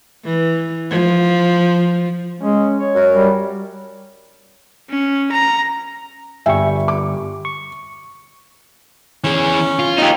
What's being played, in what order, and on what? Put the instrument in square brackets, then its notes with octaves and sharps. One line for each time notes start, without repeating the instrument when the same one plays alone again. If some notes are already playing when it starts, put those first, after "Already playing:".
[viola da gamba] E3
F3
[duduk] G#3 [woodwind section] C#4
[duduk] C#5
[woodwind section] F#2 A#4
[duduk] G3
[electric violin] C#4
A#5
[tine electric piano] G1 G3 C#6 [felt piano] E5 G5 G#5
[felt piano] D6
[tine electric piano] C#6
[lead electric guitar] E3 G#4 [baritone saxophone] C#4
[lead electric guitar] F4
[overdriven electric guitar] D#4 G4